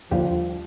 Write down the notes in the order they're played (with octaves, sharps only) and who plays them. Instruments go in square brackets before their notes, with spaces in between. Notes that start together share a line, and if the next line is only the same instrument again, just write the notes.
[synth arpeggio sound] D#2 D3 G3 D4 F4 [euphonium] F3